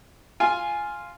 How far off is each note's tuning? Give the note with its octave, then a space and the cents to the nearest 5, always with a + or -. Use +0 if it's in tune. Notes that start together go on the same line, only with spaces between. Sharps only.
F4 +0 G#5 +5